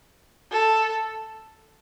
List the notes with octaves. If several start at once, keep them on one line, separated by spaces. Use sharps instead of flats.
A4